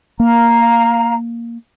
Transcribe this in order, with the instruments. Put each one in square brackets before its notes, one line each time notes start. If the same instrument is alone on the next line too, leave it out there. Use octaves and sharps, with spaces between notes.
[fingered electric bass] A#3 [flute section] F5 A#5